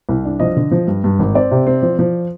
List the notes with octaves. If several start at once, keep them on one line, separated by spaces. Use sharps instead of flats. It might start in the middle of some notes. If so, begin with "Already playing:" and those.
C2
D4
F3 D#5
D3
F3
G2
G2
G#1
C4 D5
C3
C4
F3
F3